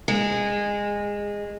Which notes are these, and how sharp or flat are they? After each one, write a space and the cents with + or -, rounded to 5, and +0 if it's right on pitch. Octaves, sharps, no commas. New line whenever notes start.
G#3 -20